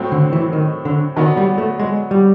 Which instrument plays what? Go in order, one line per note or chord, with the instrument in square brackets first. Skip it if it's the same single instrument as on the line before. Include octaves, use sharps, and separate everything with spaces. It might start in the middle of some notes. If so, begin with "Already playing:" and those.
Already playing: [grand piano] A2 F#3 A3 C4
[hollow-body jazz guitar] D3
E3
D#3
D3
[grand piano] D3 F#3 B3 [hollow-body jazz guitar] D#3
[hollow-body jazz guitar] G3
A3
G#3
G3